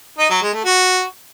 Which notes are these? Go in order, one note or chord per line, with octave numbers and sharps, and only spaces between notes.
D#4
F#3
G#3
A3
F#4